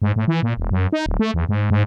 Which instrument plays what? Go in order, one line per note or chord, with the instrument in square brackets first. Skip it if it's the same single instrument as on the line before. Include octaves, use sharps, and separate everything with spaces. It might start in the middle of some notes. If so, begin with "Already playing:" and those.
[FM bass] G#2
A2
E3
A#2
E1
F#2
D#4
D1
A3
E2
G#2
G#2